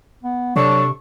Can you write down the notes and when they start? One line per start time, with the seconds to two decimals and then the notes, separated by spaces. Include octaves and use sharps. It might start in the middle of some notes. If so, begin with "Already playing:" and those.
0.23 B3
0.56 C3 F#3 D4 A4 C#6